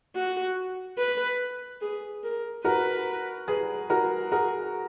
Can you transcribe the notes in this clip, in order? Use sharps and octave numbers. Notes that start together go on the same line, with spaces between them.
F#4
B4
G#4
A#4
F#4 A#4 B4
G#4 B4
F#4 A#4
F#4 G#4 A#4